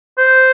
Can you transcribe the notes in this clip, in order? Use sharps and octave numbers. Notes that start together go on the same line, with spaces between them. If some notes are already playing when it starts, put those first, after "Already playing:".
C5